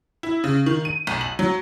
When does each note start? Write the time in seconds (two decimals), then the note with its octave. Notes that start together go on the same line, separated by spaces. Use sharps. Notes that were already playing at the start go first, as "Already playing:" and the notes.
0.23 E4
0.44 C#3
0.66 D#3
0.85 D#7
1.07 B1
1.21 F#7
1.39 F#3